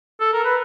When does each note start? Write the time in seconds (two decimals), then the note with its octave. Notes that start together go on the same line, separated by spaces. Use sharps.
0.21 A4
0.33 A#4
0.44 B4